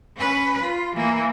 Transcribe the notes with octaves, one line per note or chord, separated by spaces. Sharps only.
C#4 B4
F4
E3 A#3